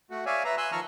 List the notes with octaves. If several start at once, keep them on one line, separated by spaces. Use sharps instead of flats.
A3 F#4
C#5 D5 E5 F5 G#5
B4 E5 A#5
G#5 C6 E6 F#6
D#3 F3 A5 A#5 C#6 F6